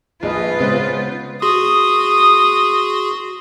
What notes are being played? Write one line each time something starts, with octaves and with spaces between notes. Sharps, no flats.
A#1 D#4 F4 G#4 B4 D#5
C#3 G#3 B3 C5
F#4 G#4 C6 D#6